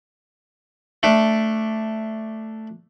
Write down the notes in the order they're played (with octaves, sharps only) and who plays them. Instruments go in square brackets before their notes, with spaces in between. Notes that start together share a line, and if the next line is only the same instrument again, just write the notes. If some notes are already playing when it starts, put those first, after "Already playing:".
[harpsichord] A3 D4